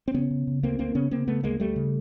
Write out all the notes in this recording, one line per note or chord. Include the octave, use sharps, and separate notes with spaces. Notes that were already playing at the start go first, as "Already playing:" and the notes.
C4
C#3 B3 C#4
C#3
C#3
D2 A#3 C4
D2 A#3 C4
C#3 B3 C#4
C#3 A#3 C4
C#3 A3 B3
D2 G#3 A#3
D2 G3 A3
C#3